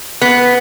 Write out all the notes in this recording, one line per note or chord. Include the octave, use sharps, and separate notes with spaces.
B3